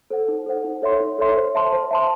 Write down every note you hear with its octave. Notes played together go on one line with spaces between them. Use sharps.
A4 C5 F#5
D#4
A4 C5 F#5
D#4
A4 C#5 E5 C6
D#4
A4 C#5 E5 C6
C5
E5 A5 C6
C5
E5 A5 C6